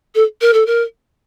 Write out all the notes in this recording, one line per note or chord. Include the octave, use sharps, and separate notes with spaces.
A4
A#4
A4
A#4